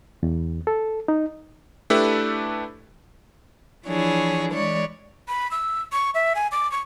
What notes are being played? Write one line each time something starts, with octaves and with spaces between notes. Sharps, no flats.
E2
A4
D#4
A3 D4 E4 G4 A4 B4
E3 F3 D4 E4 G#4 C#5
E3 G#3 C#5 D5
B5
E6
C#6
E5
G#5
D6
C#6